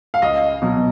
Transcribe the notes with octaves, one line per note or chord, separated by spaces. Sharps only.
F5
C#2 D#5
B2 F#3